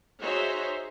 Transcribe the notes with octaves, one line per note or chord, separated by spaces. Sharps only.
D#4 F#4 G#4 C5 C#5 E5